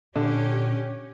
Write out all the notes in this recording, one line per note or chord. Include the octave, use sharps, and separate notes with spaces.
A#2 D3 C#4 G4